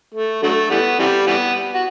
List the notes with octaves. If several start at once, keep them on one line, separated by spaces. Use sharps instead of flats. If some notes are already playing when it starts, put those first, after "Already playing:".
A3
D3 F#3 A3
E3 G3 B3
C3 E3 G3
E3 G3 B3
F#4